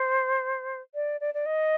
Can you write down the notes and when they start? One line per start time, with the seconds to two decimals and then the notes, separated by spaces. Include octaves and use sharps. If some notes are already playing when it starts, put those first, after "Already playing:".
Already playing: C5
0.95 D5
1.21 D5
1.34 D5
1.46 D#5